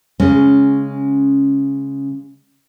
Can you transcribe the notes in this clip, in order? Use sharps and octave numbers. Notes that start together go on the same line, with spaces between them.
C#3 G#3 C#4